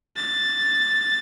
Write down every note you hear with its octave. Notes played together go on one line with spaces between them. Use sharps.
A6